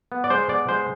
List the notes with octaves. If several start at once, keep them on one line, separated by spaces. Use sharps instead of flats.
B3
D5
G#3 C5
B3 D5
G#3 C5